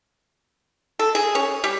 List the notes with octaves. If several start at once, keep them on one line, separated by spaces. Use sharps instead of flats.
A4
G#4
C#4
G3